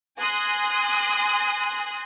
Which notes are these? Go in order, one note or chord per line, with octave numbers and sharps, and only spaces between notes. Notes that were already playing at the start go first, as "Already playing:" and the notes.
G#5 C6 D#6 F#6 A#6